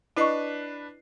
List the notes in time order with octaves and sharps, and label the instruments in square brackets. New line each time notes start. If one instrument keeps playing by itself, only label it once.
[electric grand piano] D4 B4 C7 [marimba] E4 D#5 C#6